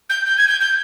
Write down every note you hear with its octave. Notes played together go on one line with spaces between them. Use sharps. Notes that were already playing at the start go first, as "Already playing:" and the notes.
G6
G6
G#6
G6
G6